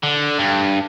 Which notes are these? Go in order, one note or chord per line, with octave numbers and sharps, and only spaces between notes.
D3
G2